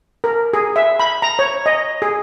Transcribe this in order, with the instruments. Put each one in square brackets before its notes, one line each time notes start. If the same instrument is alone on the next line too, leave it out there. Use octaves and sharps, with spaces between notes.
[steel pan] A#4
G#4
E5
B5
A#5
C#5
D#5
G#4